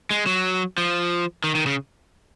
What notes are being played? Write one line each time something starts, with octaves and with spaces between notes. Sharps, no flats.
G#3
F#3
F3
D#3
D#3
C#3